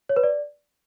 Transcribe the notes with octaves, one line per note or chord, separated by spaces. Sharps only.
C#5
B4
D5